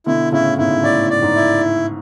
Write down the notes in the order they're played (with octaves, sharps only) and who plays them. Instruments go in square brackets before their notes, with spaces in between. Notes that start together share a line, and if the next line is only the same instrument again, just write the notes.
[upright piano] B2 D3 [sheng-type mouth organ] E4
[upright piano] A2 C#3 [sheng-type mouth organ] E4
[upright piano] G#2 B2 [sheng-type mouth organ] E4
[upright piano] A2 [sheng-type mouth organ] D5
[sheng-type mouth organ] D5
[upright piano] G#2
[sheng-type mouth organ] E4